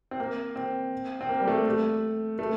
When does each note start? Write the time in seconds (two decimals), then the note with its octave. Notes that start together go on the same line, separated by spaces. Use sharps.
0.11 C4
0.20 A#3
0.56 C4
1.21 C4
1.29 A#3
1.40 G3
1.48 A3
1.66 A3
2.39 A3